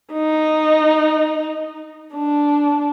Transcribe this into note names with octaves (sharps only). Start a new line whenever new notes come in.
D#4
D4